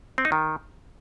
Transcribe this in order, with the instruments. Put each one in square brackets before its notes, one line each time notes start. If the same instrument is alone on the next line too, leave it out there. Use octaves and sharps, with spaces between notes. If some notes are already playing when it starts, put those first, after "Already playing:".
[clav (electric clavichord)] C4
D#4
D#3